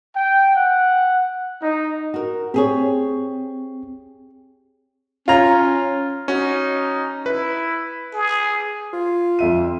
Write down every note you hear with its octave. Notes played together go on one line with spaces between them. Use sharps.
G5
F#5
D#4
F#4 A#4
C4 G4 G#4 C#5
C#4 F4 A#5
C#4 D#4 F#4
E4 B4
G#4
F4
F2 E5 D#7